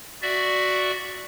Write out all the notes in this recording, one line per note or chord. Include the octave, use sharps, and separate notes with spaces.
F#4 D5 E5